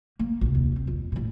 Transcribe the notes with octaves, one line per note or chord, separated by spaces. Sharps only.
A#3
A#1 C3
D#2
C4
F2
A1 A#2